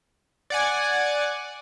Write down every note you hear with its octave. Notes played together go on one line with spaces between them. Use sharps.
D5 F#5 G#5